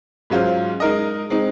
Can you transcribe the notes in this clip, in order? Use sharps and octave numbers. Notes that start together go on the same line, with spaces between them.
G#2 F#3 C#4 F4 C5
G#3 D#4 A#4 D#5
G#3 C4 D#4